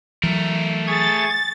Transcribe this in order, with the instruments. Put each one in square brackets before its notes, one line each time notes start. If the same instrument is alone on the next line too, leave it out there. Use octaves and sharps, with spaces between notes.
[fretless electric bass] E3 F#3 [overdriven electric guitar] A3 A#4
[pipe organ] G#4 C#6 G#6 [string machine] A6